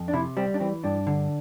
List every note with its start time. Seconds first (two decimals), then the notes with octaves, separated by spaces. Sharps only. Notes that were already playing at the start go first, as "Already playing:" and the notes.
Already playing: F2
0.08 D4
0.13 C3 E4
0.37 G3 C4
0.54 D4
0.60 E3 C4
0.84 G2 D4
1.07 D3